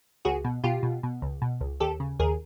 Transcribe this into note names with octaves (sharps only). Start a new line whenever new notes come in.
C#2 F#4 G#4
B2
B2 F4 G4
B2
B2
C#2
B2
C#2
D#2 G4 A4
C#3
D#2 G#4 A#4